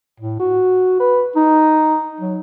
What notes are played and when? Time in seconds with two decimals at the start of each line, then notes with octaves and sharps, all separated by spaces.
0.20 A2
0.40 F#4
1.00 B4
1.36 D#4
2.21 F#3